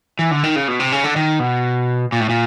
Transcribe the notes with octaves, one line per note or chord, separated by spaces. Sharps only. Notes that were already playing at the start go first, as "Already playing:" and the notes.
E3
D3
D#3
C#3
B2
C3
C#3
D3
D#3
B2
A#2
A2
A#2